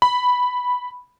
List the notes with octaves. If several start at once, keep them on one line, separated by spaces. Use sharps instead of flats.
B5